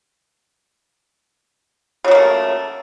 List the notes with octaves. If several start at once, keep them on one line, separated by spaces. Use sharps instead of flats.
C#3 F#3 A3 A#3